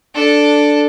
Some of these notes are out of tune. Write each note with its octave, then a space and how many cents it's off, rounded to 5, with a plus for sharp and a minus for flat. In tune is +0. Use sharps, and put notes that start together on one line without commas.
D4 +0 A4 +0